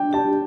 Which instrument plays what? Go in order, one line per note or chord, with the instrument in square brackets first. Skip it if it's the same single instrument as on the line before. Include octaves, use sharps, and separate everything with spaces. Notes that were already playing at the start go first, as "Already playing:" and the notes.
Already playing: [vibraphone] D4 [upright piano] G5
[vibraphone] G4 [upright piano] A5